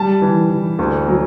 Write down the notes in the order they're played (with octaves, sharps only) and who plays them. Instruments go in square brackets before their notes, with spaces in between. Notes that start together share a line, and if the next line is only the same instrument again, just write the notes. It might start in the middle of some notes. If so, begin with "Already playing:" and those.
Already playing: [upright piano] G3 A5
E3
E3
D2
F#3